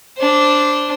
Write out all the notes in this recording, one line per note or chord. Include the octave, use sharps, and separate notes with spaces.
D4 C5